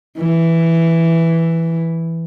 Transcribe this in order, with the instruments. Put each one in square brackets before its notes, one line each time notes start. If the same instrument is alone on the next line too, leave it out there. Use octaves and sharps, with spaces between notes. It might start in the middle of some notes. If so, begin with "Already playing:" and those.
[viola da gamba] E3